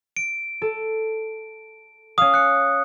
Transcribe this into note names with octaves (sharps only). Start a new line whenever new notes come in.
D7
A4
C#4 F5 D#6
F#6 C#7